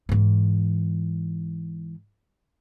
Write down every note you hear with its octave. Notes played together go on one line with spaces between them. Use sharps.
G#2 E3